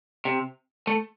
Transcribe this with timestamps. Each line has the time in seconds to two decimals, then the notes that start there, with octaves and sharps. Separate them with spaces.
0.25 C3
0.87 A3